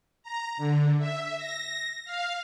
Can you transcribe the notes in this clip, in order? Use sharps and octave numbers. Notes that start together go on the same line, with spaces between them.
A#5
D3
E5
A#6
F5